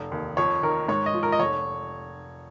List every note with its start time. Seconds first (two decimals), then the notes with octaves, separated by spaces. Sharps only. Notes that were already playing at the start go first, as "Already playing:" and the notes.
Already playing: F1
0.12 D#2
0.37 F2 C#5
0.62 D#3 A#4
0.88 G#2 C#5
1.06 D#5
1.14 F3
1.23 A#4
1.32 D#5
1.39 F1 C#5